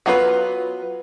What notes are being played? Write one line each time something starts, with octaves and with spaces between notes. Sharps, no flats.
F#3 B3 F4 A4 B4